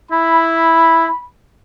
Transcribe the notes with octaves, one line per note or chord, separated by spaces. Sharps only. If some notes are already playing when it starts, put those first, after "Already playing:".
E4 B5